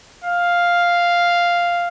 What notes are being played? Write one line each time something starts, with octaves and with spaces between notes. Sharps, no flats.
F5